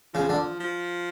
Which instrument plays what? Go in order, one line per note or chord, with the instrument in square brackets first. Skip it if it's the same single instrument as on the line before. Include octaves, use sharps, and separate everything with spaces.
[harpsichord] C#3 [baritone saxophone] F3
[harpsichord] D3
[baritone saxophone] F3